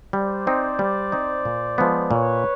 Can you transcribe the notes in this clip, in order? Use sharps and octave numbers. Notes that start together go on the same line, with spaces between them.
G3 C5 D5
C4 D#4
G3
C4 D#4
A#2
F3 G#3 B3
A#2 B4 C#5